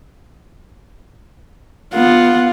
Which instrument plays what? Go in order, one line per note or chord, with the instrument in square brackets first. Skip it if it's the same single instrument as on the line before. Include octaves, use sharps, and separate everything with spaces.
[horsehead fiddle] B3 F#5 [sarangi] F4